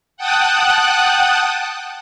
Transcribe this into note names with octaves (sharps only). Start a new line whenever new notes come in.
F#5 G5 A5 D#6 F#6